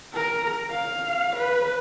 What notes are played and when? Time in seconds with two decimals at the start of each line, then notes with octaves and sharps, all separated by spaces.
0.13 A#4
0.70 F5
1.36 B4